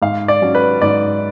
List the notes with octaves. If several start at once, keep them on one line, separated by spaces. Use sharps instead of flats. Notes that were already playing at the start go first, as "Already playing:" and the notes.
G#2 F5
D5
F#3 C#4
B4
G#2 D5